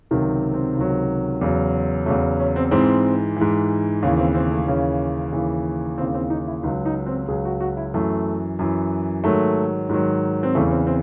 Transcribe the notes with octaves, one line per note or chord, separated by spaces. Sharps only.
C#2 C3 D#3 F#3 G#4
C4
C#2 C3 D#3 F#3
E2 C#3 F#3
E2 C#3 F#3 A3
C#4
C4
G#2 E3 C4
G#2 E3
D#2 C#3 E3 C#4
C4
C4
A3
D#2 C#3 E3 C#4
D#2 C#3 E3
D#2 C#3 E3 C4
C4
D#4
E4
C#2 C#3 F#3 D#4
D#4
C4
C#2 C#3 F#3 G#4
F#4
F#4
E4
F#2 E3 A3
F#2 E3
G#2 D#3 F#3 A3
G#2 D#3 F#3
C4
E2 C#3 E3 A3
C4
C4